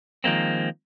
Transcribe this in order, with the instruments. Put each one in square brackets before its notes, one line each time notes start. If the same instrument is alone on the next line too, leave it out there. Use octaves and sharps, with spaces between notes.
[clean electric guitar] D#3 F3 G#3 A#3 C4